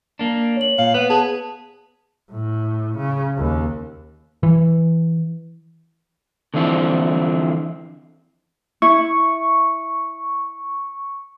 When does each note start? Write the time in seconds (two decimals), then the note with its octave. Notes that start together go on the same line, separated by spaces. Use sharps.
0.19 A#3 D4
0.57 C#5 F#7
0.78 A#2 F5
0.94 B3 B4
1.10 G#4 A5
2.31 A2
2.97 C#3
3.37 D#2
4.43 E3
6.54 D3 E3 F3 C4 D4 E4
8.82 E4 C#6